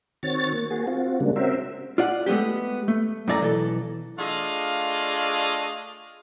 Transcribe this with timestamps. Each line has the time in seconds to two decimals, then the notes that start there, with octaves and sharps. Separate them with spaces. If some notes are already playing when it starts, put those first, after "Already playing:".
0.23 D#3 C4 F#4 C#5 A6
0.53 A#3
0.71 A#3 F#4 G#4
0.87 C4 F4 F#4
1.20 C#3 G3 G#3 A#3 D4
1.36 C4 C#4 F#4 A#4 C5 E5
1.98 F4 D5 F#5
2.26 G#3 A3 B3 C4 G4
2.88 A3
3.28 F#2 A2 A3 D5 E5 A#5
3.41 B1 E3 A4
4.19 A3 D4 F4 G#4 D#5 F5